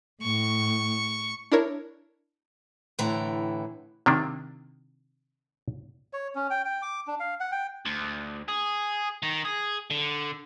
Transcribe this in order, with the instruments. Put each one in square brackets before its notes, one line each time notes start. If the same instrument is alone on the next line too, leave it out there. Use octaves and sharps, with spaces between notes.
[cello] A2 [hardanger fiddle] C#6
[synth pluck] D4 E4 A#4 C#5
[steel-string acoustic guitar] A2 D3 E3 G5 A#5
[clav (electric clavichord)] C3 D#3 A#3 D4
[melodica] C#5
C#4
G5
G5
D6
D4
F5
F#5
G5
[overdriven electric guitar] D2
G#4
D#3
G#4
D3